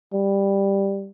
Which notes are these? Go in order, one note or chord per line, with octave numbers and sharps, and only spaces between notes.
G3